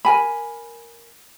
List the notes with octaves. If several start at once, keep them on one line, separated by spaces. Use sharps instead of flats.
A#4 G#5 B5